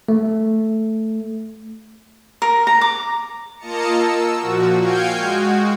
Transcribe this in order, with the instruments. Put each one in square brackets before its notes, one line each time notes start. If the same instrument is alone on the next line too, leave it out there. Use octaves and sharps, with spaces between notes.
[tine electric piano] A3
[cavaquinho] A#4
A#5
D6
[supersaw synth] A#3 F4 D#5 A5 A#5 C#7
E6
A#2 F3 F#4
F5 G5 G#5 G6 G#6 C#7
G#3 F#4